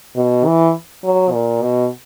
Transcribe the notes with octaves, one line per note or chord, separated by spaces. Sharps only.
B2
E3
F#3
A#2
B2